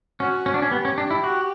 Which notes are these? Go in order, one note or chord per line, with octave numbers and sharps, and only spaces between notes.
C#4 F#4
C#4
D4
C#4
B3 G4
C#4
D4
E4
F#4